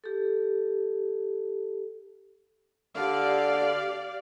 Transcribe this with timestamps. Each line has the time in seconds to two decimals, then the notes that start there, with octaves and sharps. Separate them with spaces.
0.04 G4 A4
2.96 D3 G4 D5 F5